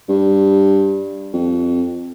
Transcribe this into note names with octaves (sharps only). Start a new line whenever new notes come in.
G2
F2